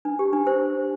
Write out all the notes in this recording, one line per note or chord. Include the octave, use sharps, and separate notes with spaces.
D4
G4
D4
C5